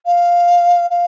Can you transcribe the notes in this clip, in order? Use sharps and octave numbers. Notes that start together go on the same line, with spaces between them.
F5
F5